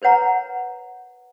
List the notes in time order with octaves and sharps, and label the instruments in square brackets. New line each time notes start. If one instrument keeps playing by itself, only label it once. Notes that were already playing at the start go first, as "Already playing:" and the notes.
[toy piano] A#4 B4 C#5 F#5 A#5